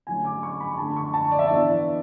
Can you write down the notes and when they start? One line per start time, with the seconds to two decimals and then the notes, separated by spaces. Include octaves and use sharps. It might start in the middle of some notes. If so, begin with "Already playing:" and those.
0.07 D3 F#3 A3 C#4 G#5
0.25 D6
0.43 C#6
0.60 B5
0.78 D3 A3 D4 A5
0.96 C#6
1.14 A5
1.31 D5
1.39 E5
1.47 E3 B3 D4 D5